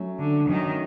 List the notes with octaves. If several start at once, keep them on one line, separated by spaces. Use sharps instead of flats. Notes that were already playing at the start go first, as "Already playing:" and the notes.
Already playing: F#3 A3 C#4
D3
D#3 F#3 A3 C#4